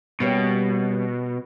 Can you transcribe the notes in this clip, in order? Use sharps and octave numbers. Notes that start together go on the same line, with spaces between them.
B2 G3 A#3 C#4